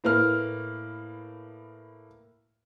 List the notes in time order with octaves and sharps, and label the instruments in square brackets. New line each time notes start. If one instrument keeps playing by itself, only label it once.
[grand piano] A2 A#3 B4 F6